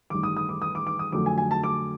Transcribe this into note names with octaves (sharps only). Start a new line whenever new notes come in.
A1 G2 D#3 D6
D#6
D#6
D6
D#6
D6
D6
D#6
F2 D3 F#3 A3 D6
G#5
G#5
A5
D6